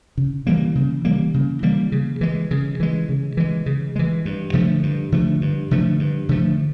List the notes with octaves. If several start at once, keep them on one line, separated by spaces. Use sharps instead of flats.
C#3
E3 G3 A#3
C#3
E3 G3 A#3
C#3
E3 G3 A#3
C#3
E3 G#3
C#3
E3 G#3
C#3
E3 G#3
C#3
E3 G#3
G2
D3 F3 A3
G2
D3 F3 A3
G2
D3 F3 A3
G2
D3 F3 A3